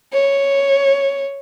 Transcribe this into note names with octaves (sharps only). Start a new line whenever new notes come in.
C#5